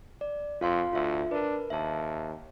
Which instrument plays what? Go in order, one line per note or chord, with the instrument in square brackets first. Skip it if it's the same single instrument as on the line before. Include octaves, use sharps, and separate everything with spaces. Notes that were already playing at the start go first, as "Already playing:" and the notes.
[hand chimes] D5
[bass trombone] F2 [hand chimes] F4 F5 C6
[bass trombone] D2 [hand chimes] F4 E5
[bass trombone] D4 [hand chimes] A#4 B4
[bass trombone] D#2 [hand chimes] E5 A5